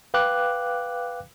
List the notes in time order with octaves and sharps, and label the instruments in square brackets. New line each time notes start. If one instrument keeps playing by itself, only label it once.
[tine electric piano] B4 F5 G5 D6 F#6